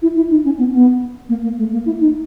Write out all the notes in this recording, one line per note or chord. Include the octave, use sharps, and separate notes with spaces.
E4
E4
D#4
C#4
B3
B3
A#3
A#3
A3
A#3
E4
D#4